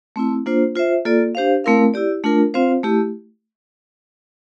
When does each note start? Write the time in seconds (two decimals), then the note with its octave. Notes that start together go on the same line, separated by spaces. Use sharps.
0.16 A3 C4 E4
0.46 A#3 D4 F4 C5
0.75 F4 C5 E5
1.05 A#3 F4 A4 D5
1.35 D4 G4 C5 F5
1.64 A3 C4 E4 A#4 F5
1.94 E4 G4 D5
2.24 A3 D4 F4 A#4
2.54 C4 F4 C5 F5
2.83 A3 E4 G4